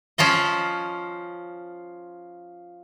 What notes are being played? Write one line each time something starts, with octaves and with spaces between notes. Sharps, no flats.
F3 C#4 F4 D#5